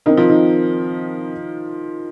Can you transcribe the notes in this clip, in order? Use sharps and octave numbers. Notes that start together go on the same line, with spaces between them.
D#3 C4 D#4 A#4 D#5
F3
D#3